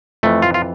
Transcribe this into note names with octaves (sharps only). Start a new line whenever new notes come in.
F2 E3 A3
F4
F4